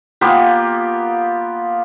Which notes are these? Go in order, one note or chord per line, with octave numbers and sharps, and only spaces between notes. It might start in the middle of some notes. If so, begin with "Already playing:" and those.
A#3 B3 F4 G4